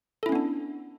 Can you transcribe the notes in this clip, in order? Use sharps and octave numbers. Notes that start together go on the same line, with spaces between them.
B3 C#4 D4 E4 A4